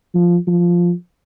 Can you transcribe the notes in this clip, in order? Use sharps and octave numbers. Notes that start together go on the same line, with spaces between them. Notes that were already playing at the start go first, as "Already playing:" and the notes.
F3
F3